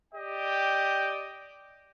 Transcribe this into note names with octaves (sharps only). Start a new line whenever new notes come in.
G4 D5 D#5 G5